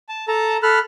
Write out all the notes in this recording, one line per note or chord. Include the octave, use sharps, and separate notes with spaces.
A5
A4 A5 A#5
A4 B5 F6 F#6